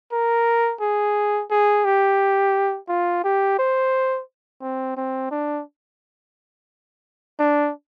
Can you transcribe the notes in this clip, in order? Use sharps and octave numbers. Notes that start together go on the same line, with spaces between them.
A#4
G#4
G#4
G4
F4
G4
C5
C4
C4
D4
D4